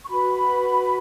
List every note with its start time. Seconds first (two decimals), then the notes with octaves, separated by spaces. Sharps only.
0.05 C#6
0.09 F#4 B4 B5